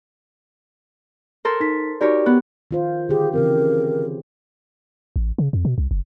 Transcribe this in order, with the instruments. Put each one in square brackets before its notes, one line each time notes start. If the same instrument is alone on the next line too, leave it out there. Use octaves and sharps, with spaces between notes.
[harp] A4 A#4 C5
[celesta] D#4 B6
[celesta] D#4 F#4 D5 [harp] G4 A#4 C#5
[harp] B3 [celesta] F#6
[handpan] D#3 F4 C5
[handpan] D3 D#3 G4 [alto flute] G#4
[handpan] C#3 E3 C4 [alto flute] A#4
[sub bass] A1
C#3
F2
B2
C2
F#1